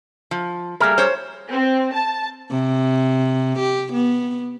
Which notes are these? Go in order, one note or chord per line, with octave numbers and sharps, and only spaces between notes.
F3
G3 A3 A#3 G#4 A#4
C5 C#5
C4
A5
C3
G4
B3